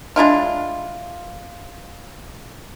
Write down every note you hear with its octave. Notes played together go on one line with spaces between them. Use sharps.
G#3 D4 E4 F4